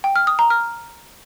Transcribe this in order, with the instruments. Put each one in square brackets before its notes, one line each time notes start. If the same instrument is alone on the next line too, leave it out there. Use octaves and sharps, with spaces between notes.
[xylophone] G5
F6
D#6
A#5
F6